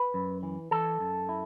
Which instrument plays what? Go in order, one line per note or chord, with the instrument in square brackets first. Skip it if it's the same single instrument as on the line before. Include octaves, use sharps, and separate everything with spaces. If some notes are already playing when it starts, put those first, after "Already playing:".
Already playing: [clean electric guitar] B4
F#2
E3
E3 A4 A5
F#2
E4